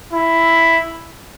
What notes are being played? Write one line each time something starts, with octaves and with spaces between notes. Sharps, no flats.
E4